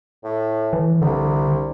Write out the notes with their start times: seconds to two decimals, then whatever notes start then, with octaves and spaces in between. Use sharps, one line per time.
0.24 A2
0.73 E3
1.02 C2 D3